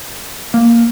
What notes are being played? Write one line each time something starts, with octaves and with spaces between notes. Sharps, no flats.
A#3